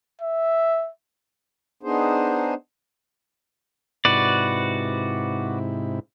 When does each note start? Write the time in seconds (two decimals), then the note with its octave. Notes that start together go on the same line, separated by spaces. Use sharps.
0.21 E5
1.83 B3 D4 D#4 G#4 C5
4.05 G#2 C3 E4 F#4 B4 D5